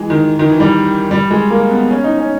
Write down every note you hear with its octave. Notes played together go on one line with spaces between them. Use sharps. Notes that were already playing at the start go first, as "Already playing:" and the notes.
Already playing: E3 G#3
D#3
D#3
E3
G3
G3
G#3
A#3
B3
C#4
D#4
C#4